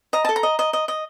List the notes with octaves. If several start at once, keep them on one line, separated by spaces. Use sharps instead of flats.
D#5 A#5
A4 A5
A#5
D#5
D#5
D#5
D#5